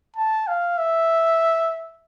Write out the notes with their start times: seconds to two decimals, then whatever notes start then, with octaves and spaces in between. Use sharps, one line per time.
0.16 A5
0.47 F5
0.78 E5